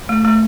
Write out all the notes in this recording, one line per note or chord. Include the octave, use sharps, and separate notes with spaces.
A3
A3